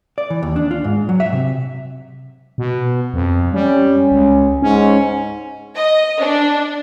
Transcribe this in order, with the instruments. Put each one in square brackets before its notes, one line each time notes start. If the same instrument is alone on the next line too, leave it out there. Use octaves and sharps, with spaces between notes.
[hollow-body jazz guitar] D5
E3
D#2
D4
F4
G#2
F#3
E5
C3
[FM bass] B2
F2
[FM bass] G3 [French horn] C#4
[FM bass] C#2
[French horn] G#2 [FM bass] C#4
[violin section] D#5
D4